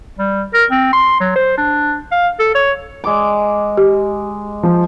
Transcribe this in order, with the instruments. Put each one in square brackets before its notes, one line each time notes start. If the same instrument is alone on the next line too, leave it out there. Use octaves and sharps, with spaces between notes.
[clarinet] G3
A#4
C4
C6
F#3
C5
D4
F5
A4
C#5
[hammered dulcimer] G#3 D6
[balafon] G4
[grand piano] F3